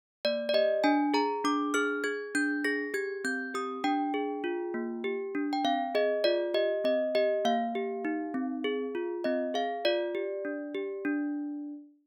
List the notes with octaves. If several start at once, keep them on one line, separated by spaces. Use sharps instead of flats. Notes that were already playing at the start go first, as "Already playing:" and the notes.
A#3 D5
D5
G4 D#5
D4 G#5
G#4 A#5
D4 D6
G#4 F6
G#4 G#6
D4 G6
G#4 A#6
G4 G#6
C4 G6
G4 D#6
D4 G5
G#4
F4
A#3
G4
D4
G5
C4 F5
G#4 D#5
F4 D5
G4 D#5
C4 D#5
G4 D#5
A#3 F5
G4
D#4
C4
G#4
F4
C4 D#5
G#4 F5
F4 D5
G4
D4
G4
D4